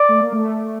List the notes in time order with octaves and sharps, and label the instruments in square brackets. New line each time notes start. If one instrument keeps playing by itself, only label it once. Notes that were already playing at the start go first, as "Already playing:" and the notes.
Already playing: [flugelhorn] D5
[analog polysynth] A3
A#3
A3